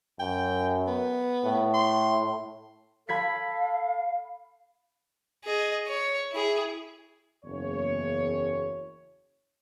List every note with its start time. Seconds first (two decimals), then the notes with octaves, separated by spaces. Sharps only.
0.20 F#2 G5
0.87 B3
1.44 A2
1.74 C6
3.09 A4 F5 B5 G#6 B6
5.44 G#4 D#5
5.87 C#5
6.32 E4 G#4
7.44 F#1 E2 C#5